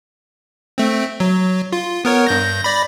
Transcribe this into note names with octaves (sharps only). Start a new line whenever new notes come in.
A3 C4
F#3
F4
B3 A#4 C#5
G2 G6 A#6
D5 B5 A#6